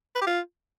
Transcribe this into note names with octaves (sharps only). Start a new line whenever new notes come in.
B4
G4
F4